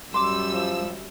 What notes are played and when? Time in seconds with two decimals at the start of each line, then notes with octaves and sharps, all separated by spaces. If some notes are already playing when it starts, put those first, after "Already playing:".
0.14 F#2 G3 C6 D6 E6
0.53 F3